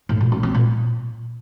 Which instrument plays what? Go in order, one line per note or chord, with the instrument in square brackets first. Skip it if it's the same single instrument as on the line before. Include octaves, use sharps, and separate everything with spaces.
[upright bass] A2
A#2
C#4
C4
A#2